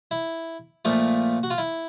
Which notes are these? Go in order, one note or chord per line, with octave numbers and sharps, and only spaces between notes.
E4
A#2 F3 A3
F#4
F4
E4